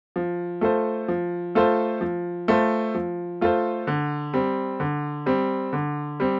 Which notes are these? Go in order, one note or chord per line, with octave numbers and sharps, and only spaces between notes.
F3
A3 F4 A4 C5
F3
A3 F4 A4 C5
F3
A3 F4 A4 C5
F3
A3 F4 A4 C5
D3
G3 C4
D3
G3 C4
D3
G3 C4